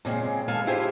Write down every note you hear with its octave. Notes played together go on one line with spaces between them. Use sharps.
A#2 C#3 G#3 C4
G#3 A4 B4 F5 G#5 A5
E4 F4 G4 G#4 C5